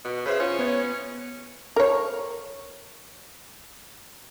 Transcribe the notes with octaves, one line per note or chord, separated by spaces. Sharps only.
B2
C#3 B4 C5 E5
C#4 F4
B3 C#5
A#4 C#5